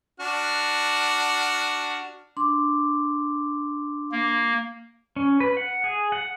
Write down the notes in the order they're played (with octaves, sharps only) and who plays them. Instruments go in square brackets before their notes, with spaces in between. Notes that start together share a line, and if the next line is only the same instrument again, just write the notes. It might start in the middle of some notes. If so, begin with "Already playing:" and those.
[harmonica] D4 F#4 F6
[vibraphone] D4 C6 D6
[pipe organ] A#3
[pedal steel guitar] C#4
B4
F#5
G#4
F#5